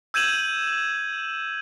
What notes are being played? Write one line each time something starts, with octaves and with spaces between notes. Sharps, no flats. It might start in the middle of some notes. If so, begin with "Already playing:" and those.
E6 G6 G#6 D#7 E7 F#7